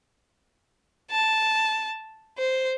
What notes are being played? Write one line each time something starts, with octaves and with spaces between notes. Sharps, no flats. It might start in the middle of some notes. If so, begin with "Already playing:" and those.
A5
C5